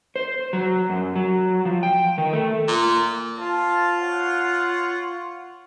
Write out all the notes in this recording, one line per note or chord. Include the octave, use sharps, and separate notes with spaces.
C5
F#3
F#2
F#3
F3
G5
D#3
A3
A#2
F4 C5 A5
C#5 F#5